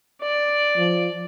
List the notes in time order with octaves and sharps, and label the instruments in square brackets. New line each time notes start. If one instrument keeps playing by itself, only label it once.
[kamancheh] D5
[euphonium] F3